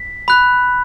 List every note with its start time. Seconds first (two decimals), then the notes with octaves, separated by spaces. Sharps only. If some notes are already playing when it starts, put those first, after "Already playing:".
Already playing: B6
0.28 B5 F#6